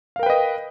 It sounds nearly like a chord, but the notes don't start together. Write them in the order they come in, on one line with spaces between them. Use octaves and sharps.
F5 A#4 G5 B4 D#5